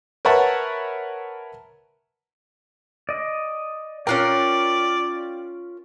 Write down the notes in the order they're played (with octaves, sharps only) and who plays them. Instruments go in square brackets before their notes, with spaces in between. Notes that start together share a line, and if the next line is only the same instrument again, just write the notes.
[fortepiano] A#4 B4 C#5 E5 F#5 A5
[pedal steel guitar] D5 D#5
[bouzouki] C#4 F4 A#4 [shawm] D5 [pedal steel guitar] G5 F#6